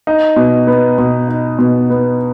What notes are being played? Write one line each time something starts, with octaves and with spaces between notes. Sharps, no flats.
D#4
B2
B3
B2
D#4
B2
B3